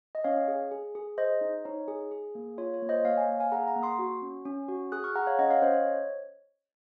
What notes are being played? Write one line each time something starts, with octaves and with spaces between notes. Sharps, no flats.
D#5
C#4 C#5 F5
G#4
G#4
G#4
G#4 C5 D#5
D#4
D#4 C#5
G#4
G#4
A#3
F4 C#5
C#5
A#3
C5 D#5
A#3 C#5 F5
F5 G#5
A#3
F5 G#5
G#4 F#5 A#5
F#5 A#5
A#3
C6 D#6
F#4
C#4
C#4
F#4
G#4 D#6 F#6
C#6 F6
G#4 F#5 A#5
C#5 F5
C#4 D#5 F#5
C#5 F5
C#4 C5 D#5
C#5